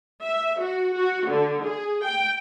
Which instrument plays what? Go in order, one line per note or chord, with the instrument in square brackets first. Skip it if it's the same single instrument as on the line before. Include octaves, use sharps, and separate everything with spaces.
[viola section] E5
F#4
F#4
D3
G#4
G5